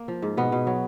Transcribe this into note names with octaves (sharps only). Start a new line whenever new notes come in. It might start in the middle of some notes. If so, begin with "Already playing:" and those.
Already playing: A#3
F3
G#2
B2 B3
B2
F#3